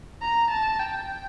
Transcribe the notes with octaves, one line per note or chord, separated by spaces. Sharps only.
A#5
A5
G5